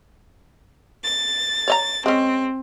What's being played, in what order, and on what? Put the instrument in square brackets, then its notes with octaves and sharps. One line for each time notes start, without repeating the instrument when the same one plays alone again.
[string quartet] A6
[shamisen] C#5 D#5 A#5
[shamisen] G#3 C#4 [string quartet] C4